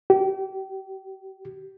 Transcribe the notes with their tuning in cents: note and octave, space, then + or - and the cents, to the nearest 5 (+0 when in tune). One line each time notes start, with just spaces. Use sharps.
G4 -30